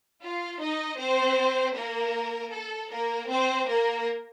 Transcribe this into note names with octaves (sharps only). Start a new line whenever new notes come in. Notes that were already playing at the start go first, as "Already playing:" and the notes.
F4 F5
D#4 D#5
C4 C5
A#3 A#4
A4
A#3 A#4
C4 C5
A#3 A#4